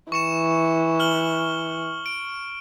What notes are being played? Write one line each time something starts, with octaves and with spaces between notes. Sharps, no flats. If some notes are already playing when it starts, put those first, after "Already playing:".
E3 C#6 C#7 E7
F6 F#7 G7
D7